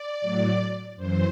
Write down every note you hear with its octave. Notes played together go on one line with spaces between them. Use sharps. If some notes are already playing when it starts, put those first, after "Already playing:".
Already playing: D5
A2 F#3
F#2 E3 C5